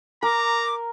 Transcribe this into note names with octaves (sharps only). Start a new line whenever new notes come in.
A#4 A#5 D6